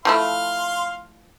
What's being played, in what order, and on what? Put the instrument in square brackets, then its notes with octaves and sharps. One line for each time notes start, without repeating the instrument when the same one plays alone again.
[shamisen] F3 A3 E4 [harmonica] F5 C6